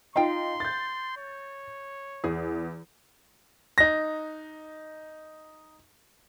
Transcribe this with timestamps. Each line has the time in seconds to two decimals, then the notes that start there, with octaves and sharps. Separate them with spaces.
0.16 D#4 F4 F5 G5 C6
0.60 G6 A6
1.17 C#5
2.24 E2 G#4
3.78 D#4 A#6